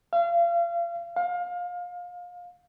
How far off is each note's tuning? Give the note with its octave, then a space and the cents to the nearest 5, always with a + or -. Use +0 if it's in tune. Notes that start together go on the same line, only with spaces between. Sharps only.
F5 -35
F5 +25